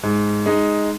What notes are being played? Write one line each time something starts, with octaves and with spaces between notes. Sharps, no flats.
G#2
G#3 D#4